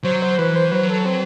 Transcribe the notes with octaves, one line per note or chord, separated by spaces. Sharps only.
F#3 C5
C5
E3 B4
C5
F#3 B4
A4
C4